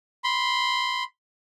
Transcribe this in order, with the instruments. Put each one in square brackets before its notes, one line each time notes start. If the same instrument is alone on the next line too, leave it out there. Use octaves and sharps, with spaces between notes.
[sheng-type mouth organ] B5 C6